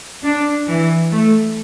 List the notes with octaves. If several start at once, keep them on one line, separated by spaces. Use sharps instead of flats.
D4
E3
A3